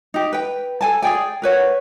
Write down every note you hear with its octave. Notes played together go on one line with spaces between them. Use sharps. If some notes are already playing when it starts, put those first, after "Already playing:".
D#4 G4
B4 G5
A4 G#5 A5
G#4 D5 G5 G#5
A#4 B4 C#5 F#5